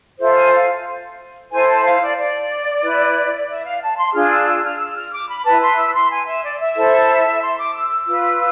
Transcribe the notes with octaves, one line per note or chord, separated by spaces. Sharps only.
F4 A4 C5 E5
G#5
F5
E4 A4 C5 G#5
A5
F5
D5
D5
E4 B4
E5
F5
A5
C6
D4 F4 G#4 F6
E6
E6
F6
E6
F6
D6
B5
E4 B4 A5
C6
E6
C6
G#5
E5
D5
E5
E4 A4 C5
C6
D6
E6
E6
F4 B4